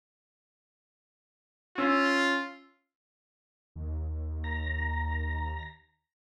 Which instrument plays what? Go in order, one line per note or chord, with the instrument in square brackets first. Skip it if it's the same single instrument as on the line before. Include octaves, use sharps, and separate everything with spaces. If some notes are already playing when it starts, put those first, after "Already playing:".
[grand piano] C#4 E6 [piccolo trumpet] F4
[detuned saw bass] D#2
[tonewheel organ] A#5